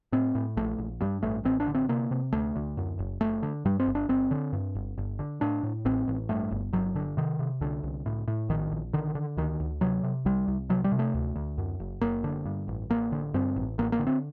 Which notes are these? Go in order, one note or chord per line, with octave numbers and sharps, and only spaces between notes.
A2 C4
A2
A#1 A3
A#1
G2 G3
A1 A3
A1 C4
D4
D3
C4
C3 A#3
C3
D2 A3
D2
F#2
F#1
F#1 A3
D3
G2 G3
C4
G1
D4
G1 C4
D3
G2
G1
G1
D3
A2 D4
A2
A1 C4
A1
G2 A3
G1
G1 F#3
D3
C3 D#3
C3
C2 D3
C2
A2
A2
A#1 D#3
A#1
D3 D#3
D3
D2 D#3
D2
C3 F#3
C3
C2 G3
C2
C3 F#3
G3
C3
A3
D2
D2
F#2
F#1
F#1 A#3
D3
G2
A1
A1 A#3
D3
G2 C4
A1
A1 A#3
A#3
D3
C4